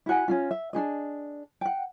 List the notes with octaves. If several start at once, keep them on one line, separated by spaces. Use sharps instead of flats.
E4 F#4 F#5 G#5
C#4 D4 F4
E5
D4 D#4 G#4 D#5
F#5 G5